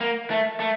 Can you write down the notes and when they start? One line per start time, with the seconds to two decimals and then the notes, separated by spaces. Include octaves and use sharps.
0.01 A#3
0.30 A3
0.60 A3